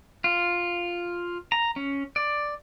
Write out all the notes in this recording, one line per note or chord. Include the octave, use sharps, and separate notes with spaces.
F4
A#5
C#4
D5